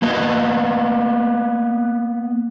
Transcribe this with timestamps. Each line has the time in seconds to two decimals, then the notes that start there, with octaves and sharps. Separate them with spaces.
0.02 A#3 B3 D#5